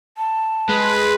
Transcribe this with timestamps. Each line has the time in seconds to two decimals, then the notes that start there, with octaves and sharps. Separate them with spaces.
0.18 A5
0.69 G#3 B4